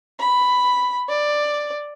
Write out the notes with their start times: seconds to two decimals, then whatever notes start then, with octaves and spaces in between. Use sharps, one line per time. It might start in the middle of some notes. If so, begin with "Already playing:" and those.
0.19 B5
1.09 D5